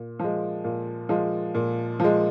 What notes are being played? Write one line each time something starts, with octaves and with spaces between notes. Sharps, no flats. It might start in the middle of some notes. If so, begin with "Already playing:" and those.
Already playing: A#2
F3 G#3
A#2
F3 G#3
A#2
F3 G#3